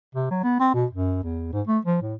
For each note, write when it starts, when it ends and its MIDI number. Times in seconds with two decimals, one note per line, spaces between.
0.15 0.27 48
0.31 0.42 54
0.44 0.56 59
0.60 0.74 60
0.74 0.86 47
0.91 1.19 42
1.23 1.49 40
1.52 1.61 44
1.67 1.78 57
1.85 1.99 53
2.02 2.14 45